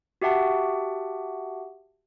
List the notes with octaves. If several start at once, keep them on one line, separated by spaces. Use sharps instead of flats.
F#4 G4 E5 F#5 A5